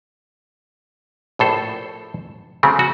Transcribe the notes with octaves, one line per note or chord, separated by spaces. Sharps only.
A#1 A2 A4 C5
C#3 F#3 A3 C4
F#4